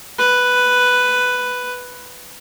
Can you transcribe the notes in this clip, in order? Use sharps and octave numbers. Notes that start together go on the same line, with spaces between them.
B4